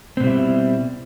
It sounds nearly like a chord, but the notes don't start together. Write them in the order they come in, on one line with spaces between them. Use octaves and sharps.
C4 B2 G3 E4